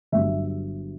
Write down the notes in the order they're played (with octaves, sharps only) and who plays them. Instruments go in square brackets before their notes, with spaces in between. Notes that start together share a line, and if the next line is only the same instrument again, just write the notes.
[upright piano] G1 G2 F#3 E5